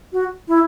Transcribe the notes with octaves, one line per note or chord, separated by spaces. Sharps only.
F#4
E4